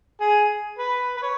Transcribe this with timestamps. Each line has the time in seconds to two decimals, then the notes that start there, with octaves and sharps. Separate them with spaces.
0.21 G#4
0.79 B4
1.17 B4
1.23 C#5